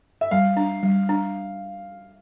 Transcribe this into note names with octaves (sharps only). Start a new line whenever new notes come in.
E5
G3 F5
D4
G3
D4